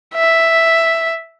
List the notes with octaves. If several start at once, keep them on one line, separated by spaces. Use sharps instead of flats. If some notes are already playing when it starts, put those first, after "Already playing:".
E5